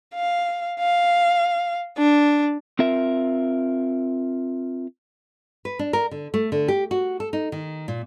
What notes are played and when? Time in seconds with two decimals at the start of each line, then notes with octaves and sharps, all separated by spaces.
0.15 F5
0.80 F5
1.98 D4
2.79 C4 F4 A#4 E5
5.65 B4
5.79 D4
5.93 A#4
6.11 D3
6.34 A3
6.52 D3
6.68 G4
6.91 F#4
7.20 A4
7.33 D#4
7.52 D#3
7.88 A#2